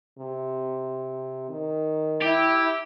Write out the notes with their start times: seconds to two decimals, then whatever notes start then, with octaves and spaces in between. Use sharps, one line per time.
0.19 C3
1.50 D#3
2.22 E4 G4